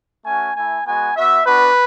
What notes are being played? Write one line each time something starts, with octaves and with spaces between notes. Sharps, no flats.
A3 C#4 F#4 G#5
A3 E4 G#5
G#3 B3 F#4 G#5
B3 F#4 E5
B3 D4 F#4 B4